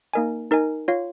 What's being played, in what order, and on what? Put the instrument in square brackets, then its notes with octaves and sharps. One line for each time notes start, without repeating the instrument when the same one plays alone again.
[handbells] A#3 D#4 A#4 D#5 G#5
D#4 A#4 D#5 G#5
F4 C#5 F5